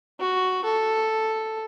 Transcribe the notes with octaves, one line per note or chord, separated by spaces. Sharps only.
F#4
A4